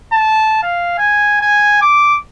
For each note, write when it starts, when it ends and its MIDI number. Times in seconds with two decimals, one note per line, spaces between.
0.12 0.58 81
0.63 0.97 77
0.98 1.41 80
1.41 1.78 80
1.82 2.19 86